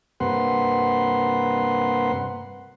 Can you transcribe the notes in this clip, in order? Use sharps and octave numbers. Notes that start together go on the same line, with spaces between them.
G2 C3 A#3 B4 F#5 C6